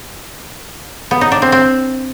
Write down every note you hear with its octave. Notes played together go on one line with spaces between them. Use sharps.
B3
D#4
D4
C4
C4